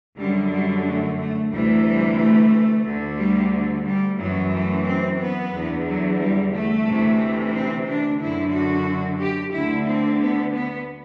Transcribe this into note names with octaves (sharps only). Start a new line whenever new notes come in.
F#2 D3 G3
G3
A3
A3
D2 C3 E3 G3
G3
A3
D2 D3
G3
G3
F#2 E3 F#3
A3
C4
B3
E2 D3
F#3
G3
A3
D2 C3 E3
C4
D4
F#2 D3 E4
F#4
G4
D2 D3 E4
C4
B3
B3